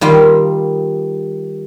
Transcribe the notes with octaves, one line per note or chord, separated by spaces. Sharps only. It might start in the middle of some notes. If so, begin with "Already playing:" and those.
D#3 G3 F4